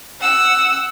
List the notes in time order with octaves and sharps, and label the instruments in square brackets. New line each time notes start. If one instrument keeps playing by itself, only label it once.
[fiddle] F#5 E6